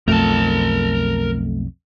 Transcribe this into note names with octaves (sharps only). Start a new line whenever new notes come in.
B1 F2 A3 A#4 A5